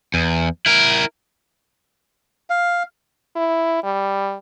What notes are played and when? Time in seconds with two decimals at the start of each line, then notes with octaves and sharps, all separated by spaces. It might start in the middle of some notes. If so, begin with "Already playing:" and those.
0.14 E2
0.66 E4 A#4
2.50 F5
3.36 E4
3.83 G3